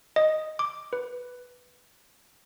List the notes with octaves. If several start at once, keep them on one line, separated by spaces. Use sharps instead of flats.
D#5
D6
B4